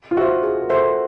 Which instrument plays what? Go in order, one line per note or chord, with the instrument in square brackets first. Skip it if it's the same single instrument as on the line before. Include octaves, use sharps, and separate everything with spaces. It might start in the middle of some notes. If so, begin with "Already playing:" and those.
[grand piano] F4
[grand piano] F#4 [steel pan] C5 E5
[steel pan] G#4
[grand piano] A#4
[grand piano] A4 [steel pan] C5 E5